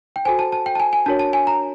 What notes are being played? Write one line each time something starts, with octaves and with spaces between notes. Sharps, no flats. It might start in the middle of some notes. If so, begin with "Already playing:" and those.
G5
F#4 A4 C5 G#5
A5
A5
G5
A5
G#5
G#5
D4 F#4 A#4 C#5 A5
A5
G#5
A#5